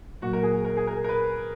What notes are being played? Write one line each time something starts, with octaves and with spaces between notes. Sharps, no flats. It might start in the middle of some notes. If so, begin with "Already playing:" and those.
A#2 F#3 A#3 F#4
A#4
G#4
A#4
G#4
A#4
A#4
B4